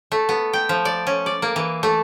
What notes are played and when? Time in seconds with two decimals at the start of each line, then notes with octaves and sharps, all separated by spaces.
0.12 A3
0.29 B3
0.53 G5
0.69 F3
0.85 D5
1.07 C#4
1.26 D5
1.42 A#3
1.56 E3
1.83 A3